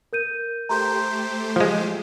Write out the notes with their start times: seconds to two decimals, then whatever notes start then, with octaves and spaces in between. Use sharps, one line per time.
0.13 A#4 G6 D#7
0.69 A3 G4 C5 A#5 C6 G6
1.56 F3 G#3